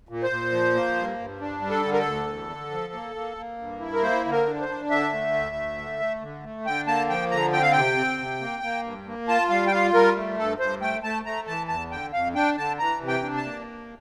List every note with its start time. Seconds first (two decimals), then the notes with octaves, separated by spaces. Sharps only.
0.09 A#2
0.23 C5
0.30 A#2
0.52 F3
0.74 A#3
0.95 G2
1.19 G2
1.40 D4
1.61 G3
1.70 A4
1.84 D3
1.93 A#4
1.99 A4
2.05 D2
2.27 E2
2.50 D3
2.71 F3
2.93 A#3
3.16 A#3
3.37 A#3
3.58 G2
3.80 E4
3.93 A#4
4.02 A#3 C5
4.25 D3
4.31 A#4
4.46 D4
4.61 C5
4.69 D4
4.90 D3 E5
5.13 A3
5.34 D2
5.55 A3
5.77 D3
6.00 A3
6.21 D3
6.43 A3
6.65 D3 G5
6.87 A#3 A5
7.09 F3 G5
7.31 D3 A#5
7.52 C4 G5
7.62 F5
7.72 C3 G5
7.97 C4
8.19 C3
8.41 A#3
8.63 A#3
8.84 G2
9.07 A#3
9.28 F4 A5
9.49 G3 F5
9.67 G5
9.71 F4 F5
9.94 G3 A#4
10.16 A3
10.38 G2 A4
10.59 G2 C5
10.81 A3 G5
11.03 A3 A5
11.25 A3 A#5
11.47 E3 A5
11.68 E2 A5
11.90 D3 G5
12.13 F2 F5
12.35 D4 G5
12.57 D3 A5
12.79 E3 A#5
13.00 C3
13.08 G5
13.23 D4
13.37 A5
13.45 A#3